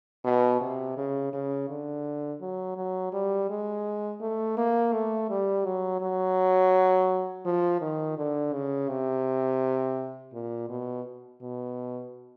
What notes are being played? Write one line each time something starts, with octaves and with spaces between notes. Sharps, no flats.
B2
C3
C#3
C#3
D3
F#3
F#3
G3
G#3
A3
A#3
A3
G3
F#3
F#3
F3
D#3
D3
C#3
C3
A#2
B2
B2